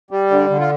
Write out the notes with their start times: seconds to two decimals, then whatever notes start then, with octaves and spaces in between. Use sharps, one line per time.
0.11 G3
0.31 D3
0.50 D3
0.59 F4